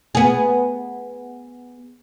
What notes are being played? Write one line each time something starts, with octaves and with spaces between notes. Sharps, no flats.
B3 G#4